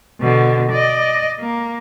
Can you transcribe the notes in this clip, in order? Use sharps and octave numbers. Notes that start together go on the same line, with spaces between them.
B2 D3
D5 D#5
A#3